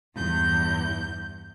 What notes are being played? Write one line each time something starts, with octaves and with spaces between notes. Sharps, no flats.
E2 G2 G6